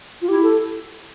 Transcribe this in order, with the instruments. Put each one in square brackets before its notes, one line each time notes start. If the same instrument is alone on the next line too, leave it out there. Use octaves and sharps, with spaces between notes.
[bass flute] F4
[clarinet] E4 [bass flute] G4
[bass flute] A4